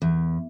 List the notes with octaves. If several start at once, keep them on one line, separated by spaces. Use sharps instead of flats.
E2